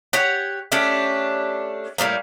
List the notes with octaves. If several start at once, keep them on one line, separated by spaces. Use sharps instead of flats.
G4 C#5 F#5
A3 C#4 D4 G4
A2 C3 G3 A#3